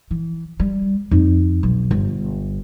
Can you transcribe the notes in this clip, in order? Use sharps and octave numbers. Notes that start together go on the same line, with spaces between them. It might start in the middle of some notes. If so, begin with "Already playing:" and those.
E3
G3
F2 D#4
B1
G1